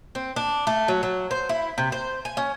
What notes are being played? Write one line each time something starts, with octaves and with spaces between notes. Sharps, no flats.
C4
D4
A3
F#3
F#3
C5
E4
C3
C5
G#5
C#4